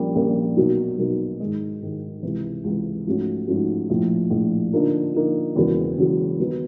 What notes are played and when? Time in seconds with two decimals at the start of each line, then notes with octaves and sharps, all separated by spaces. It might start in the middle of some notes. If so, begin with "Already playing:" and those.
Already playing: A#1 A#2 G3 A#3 C#4
0.15 A#1 A#2 G3 A#3 C#4
0.56 B1 B2 F#3 A#3 D#4
0.98 B1 B2 F#3 A#3 D#4
1.40 G#2 D#3 G#3
1.82 G#2 D#3 G#3
2.23 C#2 C3 E3
2.64 C#2 C3 E3
3.06 G#2 F3 A3 C#4 F#4
3.48 G#2 F3 A3 C#4 F#4
3.90 A#1 A2 F3
4.30 A#1 A2 F3
4.73 D3 F3 A#3 D#4
5.14 D3 F3 A#3 D#4
5.56 E1 E2 C#3 F#3 A#3
5.97 E1 E2 C#3 F#3 A#3
6.39 D#3 F#3 B3 D#4